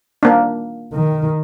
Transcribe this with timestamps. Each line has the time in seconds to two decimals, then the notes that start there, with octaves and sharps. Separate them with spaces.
0.23 A#3 D4
0.94 D#3